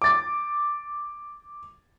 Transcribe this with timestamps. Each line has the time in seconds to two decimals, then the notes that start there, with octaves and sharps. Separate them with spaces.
0.02 D6 A6